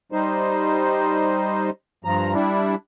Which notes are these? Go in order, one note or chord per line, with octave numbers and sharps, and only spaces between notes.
G3 D#4 C5
G2 F3 A#5
G3 D4 E4